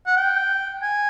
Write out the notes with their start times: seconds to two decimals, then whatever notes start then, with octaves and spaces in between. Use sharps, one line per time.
0.06 F#5
0.17 G5
0.82 G#5